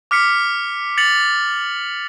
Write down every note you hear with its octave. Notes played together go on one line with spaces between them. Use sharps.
D6 F6 B6 C#7
A6 B6 C#7 F7 F#7